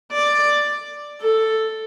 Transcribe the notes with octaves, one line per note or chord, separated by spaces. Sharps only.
D5
A4